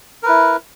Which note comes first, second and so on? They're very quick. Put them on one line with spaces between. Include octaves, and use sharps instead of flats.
A#4 B4 E4